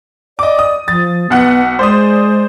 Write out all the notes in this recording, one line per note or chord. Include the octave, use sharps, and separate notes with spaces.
D5 D#5 D6
D#6
F3 A6
B1 B3 F#5 F#6
G#3 C5 D5 D#6